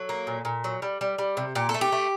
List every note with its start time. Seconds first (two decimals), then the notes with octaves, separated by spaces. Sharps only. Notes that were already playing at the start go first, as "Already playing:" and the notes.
Already playing: F#3 A4
0.09 A#3
0.27 A#2
0.45 A#2
0.64 F#3
0.82 G3
1.01 G3
1.18 G3
1.37 C3
1.55 A#2 G4
1.69 A4
1.74 A3
1.81 G4
1.92 A3